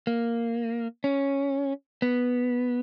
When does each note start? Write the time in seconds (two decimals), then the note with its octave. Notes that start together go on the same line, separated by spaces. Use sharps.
0.07 A#3
1.04 C#4
2.02 B3